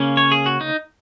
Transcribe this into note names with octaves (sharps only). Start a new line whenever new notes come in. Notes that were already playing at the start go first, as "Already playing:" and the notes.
Already playing: C#3 A#3 C#4
C#5
G#4
F#4
D#4